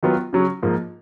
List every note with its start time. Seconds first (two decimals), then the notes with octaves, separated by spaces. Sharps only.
0.03 D#3 F#3 B3 F4
0.33 C#3 F#3 C#4
0.62 G#2 F3 A#3